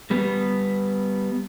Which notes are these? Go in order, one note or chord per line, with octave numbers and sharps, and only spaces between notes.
G3 B3